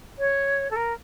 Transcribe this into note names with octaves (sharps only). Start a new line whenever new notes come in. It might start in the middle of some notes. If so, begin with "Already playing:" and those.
C#5
A4
A#4